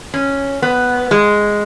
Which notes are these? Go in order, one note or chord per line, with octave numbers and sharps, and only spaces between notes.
C#4
B3
G#3